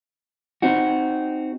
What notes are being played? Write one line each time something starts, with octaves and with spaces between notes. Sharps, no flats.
C4 D#4 F#4